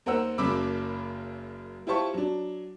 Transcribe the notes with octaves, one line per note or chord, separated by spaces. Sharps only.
D#2 A#4 C5 F#5 E6
F#1 F#2 C#3 B5 D6 E6
E4 F4 G4 C5 A5 C#6
F#3 D4